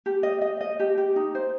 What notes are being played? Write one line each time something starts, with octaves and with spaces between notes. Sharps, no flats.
G4
D#5
D#5
D#5
G4
G4
D#4
C5